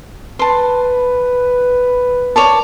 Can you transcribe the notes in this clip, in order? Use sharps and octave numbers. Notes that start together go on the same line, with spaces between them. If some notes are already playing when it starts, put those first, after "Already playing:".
B4 A5 C6
C#5 D5 A5